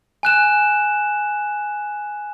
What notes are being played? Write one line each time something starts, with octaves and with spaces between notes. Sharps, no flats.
G#5 F#6 E7